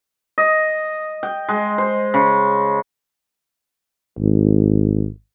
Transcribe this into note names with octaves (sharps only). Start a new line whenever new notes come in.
D#5
G5
G#3
C5
C#3
G#1